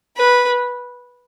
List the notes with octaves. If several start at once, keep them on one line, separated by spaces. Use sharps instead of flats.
B4